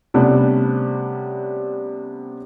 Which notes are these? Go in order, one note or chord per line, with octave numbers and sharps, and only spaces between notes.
C3 G3 A3 B3 C#4 D4